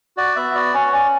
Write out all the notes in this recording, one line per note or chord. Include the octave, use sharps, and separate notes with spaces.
F#4 D5
B3 E5
F#4 D5
C#4 C#5
C#4 D5